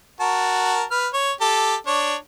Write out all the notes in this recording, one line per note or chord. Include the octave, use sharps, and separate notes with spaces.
F#4 A#4 A5
B4 F6
C#5
G4 A4
D4 C#5